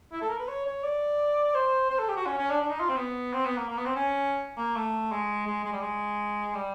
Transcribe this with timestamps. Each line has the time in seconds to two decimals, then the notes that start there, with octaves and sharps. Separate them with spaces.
0.12 E4
0.21 A4
0.29 A#4
0.39 B4
0.48 C#5
0.66 C#5
0.84 D5
1.54 C5
1.90 C5
1.99 A4
2.09 G4
2.17 F#4
2.26 C#4
2.38 C#4
2.51 D4
2.62 D4
2.70 D#4
2.80 F4
2.89 C4
2.97 B3
3.33 C4
3.46 B3
3.57 A#3
3.69 A#3
3.77 B3
3.86 C4
3.96 C#4
4.57 A#3
4.76 A3
5.12 G#3
5.47 G#3
5.65 G#3
5.72 G3
5.82 G#3
6.55 G3